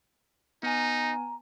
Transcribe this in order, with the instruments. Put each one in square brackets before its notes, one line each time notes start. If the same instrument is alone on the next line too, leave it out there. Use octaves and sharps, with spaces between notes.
[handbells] B3 G#5 [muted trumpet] D#4 [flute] A#5